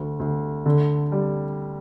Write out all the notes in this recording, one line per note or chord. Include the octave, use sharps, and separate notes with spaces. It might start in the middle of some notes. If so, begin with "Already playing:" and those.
Already playing: D2
D2
D3
G3